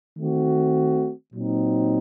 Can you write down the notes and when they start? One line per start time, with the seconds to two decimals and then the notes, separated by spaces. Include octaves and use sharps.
0.18 D#3 A3 C4 F#4
1.34 A#2 F#3 C4 D#4